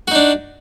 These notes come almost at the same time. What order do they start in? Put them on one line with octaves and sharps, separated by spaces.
F#4 D#4 D4